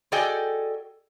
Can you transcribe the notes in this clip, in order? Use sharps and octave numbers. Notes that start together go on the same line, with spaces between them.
F#4 G#4 A4 D5 D#5 G5